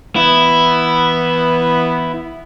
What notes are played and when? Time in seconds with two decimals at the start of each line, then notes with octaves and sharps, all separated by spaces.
0.16 E3 B3 E4